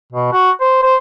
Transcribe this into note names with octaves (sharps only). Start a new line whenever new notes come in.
B2
F#4
C5
C5